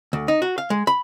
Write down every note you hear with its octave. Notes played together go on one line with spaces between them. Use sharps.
D2
D#4
F#4
F5
G#3
B5